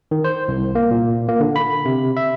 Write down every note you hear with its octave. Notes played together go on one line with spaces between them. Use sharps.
D#3
C5
C2
A#3
A#2
A#3
D3
B5
C3
E5